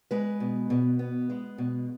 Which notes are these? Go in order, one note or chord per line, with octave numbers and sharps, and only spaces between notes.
G#3 B4
B2
B2
B3
G#3
B2